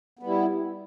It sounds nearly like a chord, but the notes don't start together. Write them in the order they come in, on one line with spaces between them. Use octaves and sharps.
B3 G3 E4